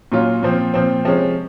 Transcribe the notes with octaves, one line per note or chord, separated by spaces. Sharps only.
A#2 F#3 C#4 F4
A#2 F3 C4
A#2 F3 C4
C3 F3 G#3 C#4